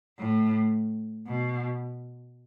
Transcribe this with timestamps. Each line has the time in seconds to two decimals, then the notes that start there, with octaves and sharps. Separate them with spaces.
0.19 A2
1.27 B2